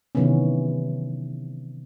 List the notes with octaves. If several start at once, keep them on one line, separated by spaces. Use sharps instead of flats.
C3 D#3 E3 F#3 B3 C#4